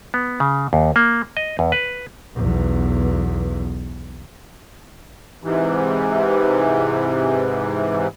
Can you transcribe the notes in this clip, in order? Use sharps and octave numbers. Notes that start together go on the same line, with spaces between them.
B3
C#3
D#2
A#3
D#5
E2
B4
B1 E2
G#2 C3 E3